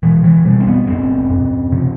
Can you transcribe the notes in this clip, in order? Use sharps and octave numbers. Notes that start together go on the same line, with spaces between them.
B2 E3
E3
B2 G3
C4
B3
F#2 C4
F#2
C3